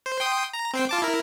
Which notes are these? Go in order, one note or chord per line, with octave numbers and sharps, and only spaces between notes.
C5
G5 C6 D#6
A#5
C4 C5 G5
F4 A5 D6
E4 A#4